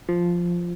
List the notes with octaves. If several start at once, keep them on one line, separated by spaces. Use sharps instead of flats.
F3